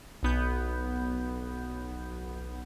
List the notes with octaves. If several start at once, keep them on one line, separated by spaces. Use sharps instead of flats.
B1 B3 G6